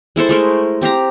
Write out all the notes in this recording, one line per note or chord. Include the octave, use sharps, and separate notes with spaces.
G#3 E4 A4 C5
G#3 A3 A#4
C4 G4 F5 A#5